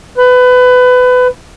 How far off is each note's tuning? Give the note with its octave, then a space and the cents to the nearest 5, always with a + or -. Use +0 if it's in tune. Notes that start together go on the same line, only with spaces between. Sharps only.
B4 +25